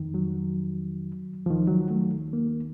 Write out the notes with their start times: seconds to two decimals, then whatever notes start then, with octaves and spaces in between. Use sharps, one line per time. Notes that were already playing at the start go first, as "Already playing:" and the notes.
Already playing: F2 D#3
0.14 F#3
1.46 D#2 D#3 F3
1.67 F#3
1.90 A3
2.33 A#3